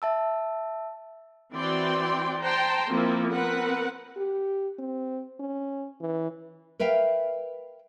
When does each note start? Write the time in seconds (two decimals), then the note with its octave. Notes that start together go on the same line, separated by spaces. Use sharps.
0.02 E5 A5 E6
1.53 E3 C4 F#4 D5 G5 C6
2.39 C5 G5 A5 A#5 C6
2.89 F3 A#3 C4 E4
3.30 B3 C4 A#4 B4 F#5
4.16 G4
4.79 C4
5.40 C#4
6.00 E3
6.79 A#4 B4 E5 F5 G5